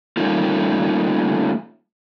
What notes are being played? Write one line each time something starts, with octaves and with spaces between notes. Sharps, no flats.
G3 A3 A#3 C#4 D#4 F4